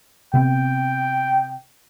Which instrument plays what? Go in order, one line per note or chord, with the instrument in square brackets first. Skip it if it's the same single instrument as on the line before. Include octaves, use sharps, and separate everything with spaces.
[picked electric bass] C3 B3 C4 [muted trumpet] G5